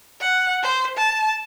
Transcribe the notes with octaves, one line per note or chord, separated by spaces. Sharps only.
F#5
C5
A5